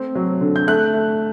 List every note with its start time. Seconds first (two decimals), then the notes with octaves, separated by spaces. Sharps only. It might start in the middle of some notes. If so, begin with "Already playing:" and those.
Already playing: A3 C4
0.15 F#3
0.41 D3
0.56 G6
0.68 A3 F#6
0.93 A3